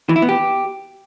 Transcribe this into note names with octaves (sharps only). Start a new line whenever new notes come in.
E3
E4
B3
G4